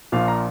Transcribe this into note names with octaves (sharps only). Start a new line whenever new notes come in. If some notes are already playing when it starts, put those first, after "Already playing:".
A#1 A#2 F3 F5
A#5